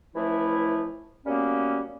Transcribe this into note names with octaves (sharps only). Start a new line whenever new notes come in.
C#2 E3 F3 A3 E4
F#2 G3 A#3 B3 C#4